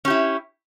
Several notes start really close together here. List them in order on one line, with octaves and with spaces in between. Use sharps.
C#4 G4 E4